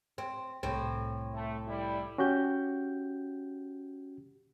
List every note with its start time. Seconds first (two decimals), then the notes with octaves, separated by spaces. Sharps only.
0.18 C4
0.63 C2 A2 C4
1.33 A3
1.67 G3 E4
2.18 C#4 F#4 G4 G6